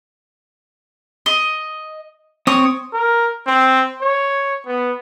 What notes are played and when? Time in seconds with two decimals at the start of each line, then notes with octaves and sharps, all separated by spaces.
1.26 D#5
2.47 C4 C#5 D#6
2.93 A#4
3.47 C4
4.02 C#5
4.67 B3